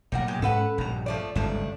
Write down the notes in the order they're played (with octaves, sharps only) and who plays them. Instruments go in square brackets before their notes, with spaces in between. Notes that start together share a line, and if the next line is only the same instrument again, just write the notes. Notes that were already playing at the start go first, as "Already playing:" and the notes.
[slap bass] B1 A#2 [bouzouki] G3 A#4 F#5
[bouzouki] G#3 G4
[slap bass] G#2 C#4 [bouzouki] A4 B4 F#5
[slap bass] A#1 G2 [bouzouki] B2 A#5
[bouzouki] F3 A3 D5
[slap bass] G1 C#2 G#2 [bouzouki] F3 A3 D4